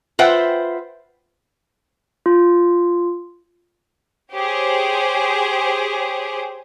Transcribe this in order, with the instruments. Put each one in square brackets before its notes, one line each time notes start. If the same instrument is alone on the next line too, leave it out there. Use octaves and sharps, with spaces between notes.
[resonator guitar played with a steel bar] F4 B4 C5 E5 F#5 G5
[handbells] F4
[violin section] G4 G#4 C5 C#5